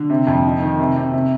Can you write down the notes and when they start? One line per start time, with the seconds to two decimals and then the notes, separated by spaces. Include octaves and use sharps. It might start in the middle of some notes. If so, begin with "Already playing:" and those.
Already playing: D3
0.10 C3
0.27 F2
0.45 D#4
0.62 D#3
0.79 C3
0.96 C3
1.13 C3